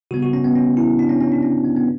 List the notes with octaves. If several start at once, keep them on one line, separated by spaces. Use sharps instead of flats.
C#3 G3 B3 F#4
F#4
C#4
B3
C#4
E4
D4
C#4
C#4
D4
C#4
B3
B3